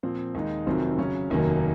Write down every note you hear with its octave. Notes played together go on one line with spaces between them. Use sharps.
A#2 F3 C4
D#2 D#3 G#3 D#4
F1 F2 D#3 F#3 C4
C#3 F#3 C#4
F1 D#2 D#3 F#3 A#3